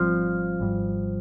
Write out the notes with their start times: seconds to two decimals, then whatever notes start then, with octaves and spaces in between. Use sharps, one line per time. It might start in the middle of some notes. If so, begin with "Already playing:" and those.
Already playing: G#1 F3 G3 C4
0.60 G#1 G#2 G3